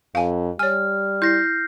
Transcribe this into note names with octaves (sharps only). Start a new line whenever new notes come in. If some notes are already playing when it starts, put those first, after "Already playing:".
F2 F5 G#5
G3 C#5 G#5 F6
E4 G6 A#6 C7